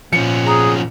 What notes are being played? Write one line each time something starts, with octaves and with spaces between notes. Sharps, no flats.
A#2 F3 C#4 C#7
G#4 A#5